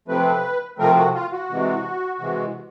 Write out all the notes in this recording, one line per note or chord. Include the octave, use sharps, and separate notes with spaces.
C3 F3 A3 C4 B4
C3 F3 A3 C4 A#4
F#4
F4
F#4
C3 E3 G#3
C3 E3 G#3